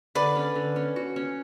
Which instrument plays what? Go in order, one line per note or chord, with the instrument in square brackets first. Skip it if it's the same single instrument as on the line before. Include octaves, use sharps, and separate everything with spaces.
[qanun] D3 [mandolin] B4 D5
[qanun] C#4
D3
C#4
F#4
C#4